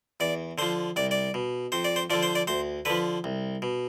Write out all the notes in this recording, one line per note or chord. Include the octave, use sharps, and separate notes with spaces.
E2 D5
D3 F3 C5
C2 D5
D5
B2
F2 C5
D5
C5
D3 F3 D5
C5
D5
D2 C5
D3 F3 B4
C2
B2